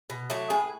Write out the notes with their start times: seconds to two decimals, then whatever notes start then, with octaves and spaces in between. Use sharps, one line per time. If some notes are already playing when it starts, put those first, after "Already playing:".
0.10 B2
0.30 F#3 A3 D4
0.50 A2 G#4 B4